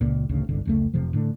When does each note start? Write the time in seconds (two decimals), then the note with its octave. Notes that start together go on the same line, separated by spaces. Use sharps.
0.01 C#2 A#2
0.29 A1 D2 C#3
0.49 G1 C2 D3
0.65 F1 C#2 A3
0.94 F1 C3 F3
1.13 A2 D3